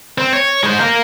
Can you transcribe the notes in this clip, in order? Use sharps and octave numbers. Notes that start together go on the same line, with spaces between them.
C4
C#5
G#3 C5
A#3 A#4